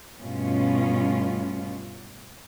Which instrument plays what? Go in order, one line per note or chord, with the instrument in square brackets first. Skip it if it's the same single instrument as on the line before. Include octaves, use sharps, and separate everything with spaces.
[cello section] G2 B2 A3 C#4 F4